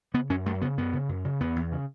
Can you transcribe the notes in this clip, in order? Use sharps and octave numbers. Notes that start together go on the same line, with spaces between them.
C#3 B3
F#2 C#4
F#2 A3
C#3 B3
F#2 B3
C#3
F#2
C#3
E2 B3
E2
C#3